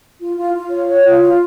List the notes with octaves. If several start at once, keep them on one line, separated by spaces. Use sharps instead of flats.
F4
F4
F4
C#5
C#5
F4
F4